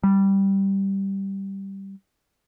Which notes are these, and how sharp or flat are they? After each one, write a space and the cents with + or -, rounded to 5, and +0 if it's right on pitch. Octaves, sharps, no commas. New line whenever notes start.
G3 -5